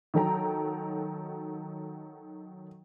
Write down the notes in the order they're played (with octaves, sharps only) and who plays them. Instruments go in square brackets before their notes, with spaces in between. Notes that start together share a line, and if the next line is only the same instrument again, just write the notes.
[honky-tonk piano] D#3 F#3 A4 G5 A#5